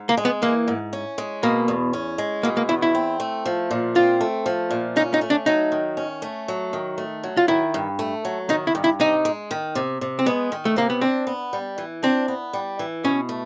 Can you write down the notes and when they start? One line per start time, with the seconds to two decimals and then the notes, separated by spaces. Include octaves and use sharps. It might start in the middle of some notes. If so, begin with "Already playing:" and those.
Already playing: G#2
0.09 A#3
0.17 G#3
0.25 B3
0.42 E3 A#3
0.68 G#2
0.93 C#4
1.18 G#3
1.43 B2 A#3
1.68 E2
1.93 C#4
2.18 G#3
2.43 B2 A#3
2.57 A#3
2.69 E2 E4
2.82 E4
2.95 C4
3.20 A3
3.46 F3
3.71 A#2
3.95 C4 F4
4.21 A3
4.46 F3
4.71 A#2
4.96 C#4 D#4
5.14 D#4
5.21 A3
5.30 D4
5.46 F#3 D#4
5.72 D#3
5.97 C#4
6.22 A3
6.48 F#3
6.73 D#3
6.98 A3
7.23 F#3
7.37 F4
7.48 D#3 E4
7.74 G2
7.99 A3
8.25 F#3
8.49 D#3 D#4
8.67 E4
8.75 G2
8.84 E4
9.00 C3 D#4
9.25 G#3
9.51 D#3
9.75 C3
10.01 C3
10.19 C4
10.26 G#3 B3
10.52 D#3
10.65 A3
10.76 C3 A#3
10.90 B3
11.01 C4 D4
11.27 B3
11.53 G3
11.78 E3
12.03 C4 D4
12.28 B3
12.53 G3
12.79 E3
13.04 B2 C#4
13.29 A3